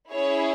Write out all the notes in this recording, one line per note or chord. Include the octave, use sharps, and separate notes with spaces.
C#4 E4 G#4 C#5